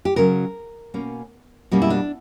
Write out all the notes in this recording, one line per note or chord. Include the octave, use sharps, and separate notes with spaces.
G4
C#3 F#3 C#4 A#4
B2 A#3 C#4
B2 G3 A#3 C#4
E4
D4